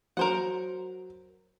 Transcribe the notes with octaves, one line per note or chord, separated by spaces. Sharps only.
F#3 A#4 C5 F#5